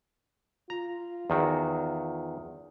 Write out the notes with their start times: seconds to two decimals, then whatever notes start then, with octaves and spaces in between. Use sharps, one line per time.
0.70 F4 A#5
1.30 E2 D#3 F#4